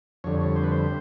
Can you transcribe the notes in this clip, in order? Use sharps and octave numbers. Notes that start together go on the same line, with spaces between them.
F2 D3 G3 C#5
C#5
C5
B4
C5